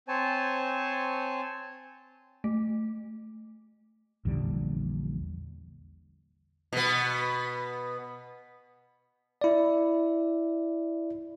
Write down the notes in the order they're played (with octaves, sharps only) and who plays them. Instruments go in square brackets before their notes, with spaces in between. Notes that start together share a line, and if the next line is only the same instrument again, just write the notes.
[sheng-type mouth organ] C4 C5 C#5 G#5 A5
[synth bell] A3
[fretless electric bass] A#1 E2 D3 G3
[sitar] B2 B3
[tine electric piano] E4 D5